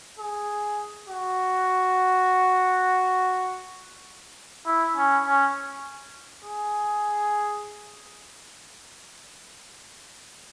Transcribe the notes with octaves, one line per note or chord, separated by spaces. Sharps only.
G#4
F#4
E4
C#4
C#4
G#4